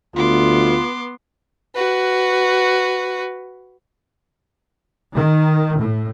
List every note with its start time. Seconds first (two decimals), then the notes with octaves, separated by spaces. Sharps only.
0.16 D2 B3 F4 C6 D6
1.75 F#4 B4
5.14 D#3
5.77 A2